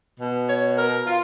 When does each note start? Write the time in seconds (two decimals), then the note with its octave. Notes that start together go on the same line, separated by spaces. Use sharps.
0.20 B2
0.48 C#5
0.77 A#4
1.05 F4